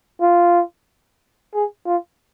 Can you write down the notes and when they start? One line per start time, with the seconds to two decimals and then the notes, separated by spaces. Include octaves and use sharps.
0.21 F4
1.54 G#4
1.86 F4